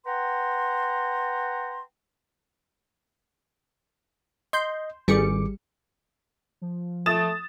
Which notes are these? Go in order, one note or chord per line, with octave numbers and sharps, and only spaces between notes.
B4 F#5 G5 A#5 C6
D#5 C6 G6
G#1 G3 G#4 D6 C#7
F3
A3 D#6 A6 E7